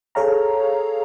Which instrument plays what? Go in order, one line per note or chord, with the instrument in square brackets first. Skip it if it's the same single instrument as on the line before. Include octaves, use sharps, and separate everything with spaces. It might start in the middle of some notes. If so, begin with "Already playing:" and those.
[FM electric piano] G#4 A4 C#5 F5 A#5